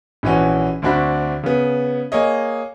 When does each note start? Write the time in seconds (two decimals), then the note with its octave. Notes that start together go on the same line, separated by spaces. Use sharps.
0.23 A#1 E3 C#4 F#4
0.82 D2 C4 D4 F#4 B5
1.43 C#3 B3
2.12 A#3 G#4 C#5 D#5